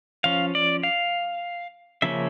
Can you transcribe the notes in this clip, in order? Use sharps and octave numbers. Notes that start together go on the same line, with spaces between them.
F3 C#4 F5
D5
F5
C#3 F3 A#3 C#4 E5